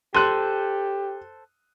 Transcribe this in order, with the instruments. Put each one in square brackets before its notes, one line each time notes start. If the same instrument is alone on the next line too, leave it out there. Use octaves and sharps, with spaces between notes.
[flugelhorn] G4 [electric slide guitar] A4 C5 [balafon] C6 [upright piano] F#6 D#7